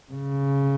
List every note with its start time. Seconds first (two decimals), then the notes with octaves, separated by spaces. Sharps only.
0.12 C#3